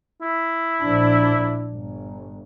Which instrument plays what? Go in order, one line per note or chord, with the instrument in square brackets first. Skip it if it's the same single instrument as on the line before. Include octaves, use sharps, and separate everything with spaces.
[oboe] E4
[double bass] A#1 D4
G1